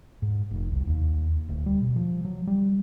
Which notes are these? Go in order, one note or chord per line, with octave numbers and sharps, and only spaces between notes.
G#2
F1
C2
D#2
D1
G3
B2
F3
F#3
G3